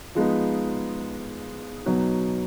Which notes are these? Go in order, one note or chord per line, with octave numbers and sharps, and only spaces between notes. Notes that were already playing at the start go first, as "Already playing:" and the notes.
F3 G#3 B3 D#4
B2 F#3 B3 D#4 F#4